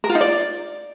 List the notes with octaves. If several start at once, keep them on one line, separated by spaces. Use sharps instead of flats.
A#4
F4
D#4
D5